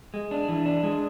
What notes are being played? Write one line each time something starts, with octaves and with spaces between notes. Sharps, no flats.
G#3
D4
E3
D4
G#3